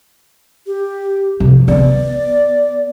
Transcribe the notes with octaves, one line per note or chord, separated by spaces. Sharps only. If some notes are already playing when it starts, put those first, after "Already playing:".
G4
C3 F3
B3 D5